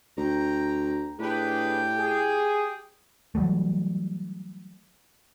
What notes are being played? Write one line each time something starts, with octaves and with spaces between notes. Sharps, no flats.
D2 G5 A#5
A2 D4 G4 G#4 B4 G5
G#4
E3 F#3 G3 A3